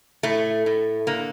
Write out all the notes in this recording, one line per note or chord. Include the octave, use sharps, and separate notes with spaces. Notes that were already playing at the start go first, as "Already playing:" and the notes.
A2 A3
A2
D3 A#3